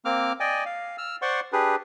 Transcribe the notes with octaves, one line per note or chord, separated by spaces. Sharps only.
A#3 C4 D6 F6
D5 D#5 G5 G#5
F5
E6 F6
C5 D5 F#5 C6 C#6
D4 G4 G#4 B4